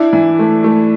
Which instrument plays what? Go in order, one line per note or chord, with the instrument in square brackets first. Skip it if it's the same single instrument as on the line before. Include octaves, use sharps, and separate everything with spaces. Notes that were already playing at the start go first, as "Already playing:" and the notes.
Already playing: [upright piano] D4 [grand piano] E4
[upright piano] E3
A3
A3